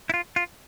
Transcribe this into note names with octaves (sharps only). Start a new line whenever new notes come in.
E4
F4
F4